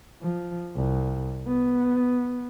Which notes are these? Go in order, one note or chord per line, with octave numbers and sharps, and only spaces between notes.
F3
C2
B3